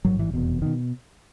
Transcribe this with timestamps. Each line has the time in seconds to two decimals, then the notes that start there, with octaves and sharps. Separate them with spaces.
0.05 A1 G#2 F#3
0.19 E3
0.34 F1 E2 B2
0.62 B2 D#3